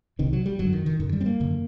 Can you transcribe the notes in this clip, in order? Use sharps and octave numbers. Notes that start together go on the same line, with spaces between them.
C2 C3 D#3
F#3
G3
F#2 D3 F#3
D#3
D#3
F#2 D3 D#3
G3
C4
A#3
F#2 D3